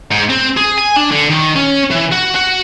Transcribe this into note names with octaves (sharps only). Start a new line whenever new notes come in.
G#2
C4
G#4
G#5
D4
D3
D#3
C#4
E3
F#4
F#4